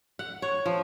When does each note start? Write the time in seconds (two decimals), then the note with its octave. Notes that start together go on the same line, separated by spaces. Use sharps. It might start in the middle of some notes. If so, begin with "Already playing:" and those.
0.19 F#5
0.42 C#5
0.66 F3